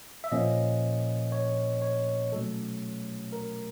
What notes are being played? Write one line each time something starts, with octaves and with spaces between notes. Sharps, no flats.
E5
A#2 F3 A#3 C#4 D#5
C#5
C#5
B2 F#3 A3 C#4 A4
A#4